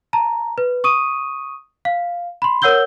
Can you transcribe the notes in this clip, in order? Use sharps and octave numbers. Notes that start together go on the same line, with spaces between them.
A5 A#5
B4
C#6 D#6 D#7
F5
B5 C6
A#4 C#5 F#5 E6 G6 G7